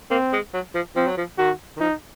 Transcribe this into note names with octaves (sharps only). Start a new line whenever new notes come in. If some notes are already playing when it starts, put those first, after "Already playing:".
A#3 C4
G#3
F#3
F3
F3 C4
F#3
F3
D#3 F#4
D#3
F3 D#4